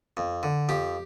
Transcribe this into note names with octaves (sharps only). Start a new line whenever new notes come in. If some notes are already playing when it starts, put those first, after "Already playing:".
F2
D3
F2 G4